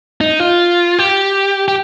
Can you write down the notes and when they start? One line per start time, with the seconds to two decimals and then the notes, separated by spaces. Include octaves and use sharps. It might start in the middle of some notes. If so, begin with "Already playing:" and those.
0.21 D#4
0.40 F4
0.99 G4
1.68 G4